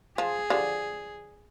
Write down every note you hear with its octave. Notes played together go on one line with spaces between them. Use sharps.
F3 G#4
D3 F3 G4